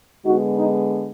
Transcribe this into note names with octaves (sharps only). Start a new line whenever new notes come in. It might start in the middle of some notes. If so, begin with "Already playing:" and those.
D3 G#3 B3 D#4 F#4
D#4